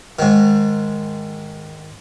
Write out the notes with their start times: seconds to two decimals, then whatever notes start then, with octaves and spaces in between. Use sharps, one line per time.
0.19 G#2 D#3